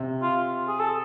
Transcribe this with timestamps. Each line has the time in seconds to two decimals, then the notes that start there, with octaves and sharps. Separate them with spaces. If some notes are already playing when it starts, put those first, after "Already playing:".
Already playing: C3
0.22 F4
0.68 G#4
0.79 A4